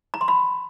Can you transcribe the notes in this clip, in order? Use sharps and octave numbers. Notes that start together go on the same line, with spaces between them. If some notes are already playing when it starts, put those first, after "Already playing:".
A#5
C6
B5